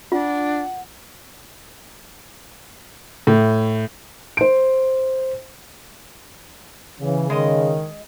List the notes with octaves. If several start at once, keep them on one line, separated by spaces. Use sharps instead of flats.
D4 F4 F#5
A2
C5 D7
C#3 E3
D#3 G#3 D#5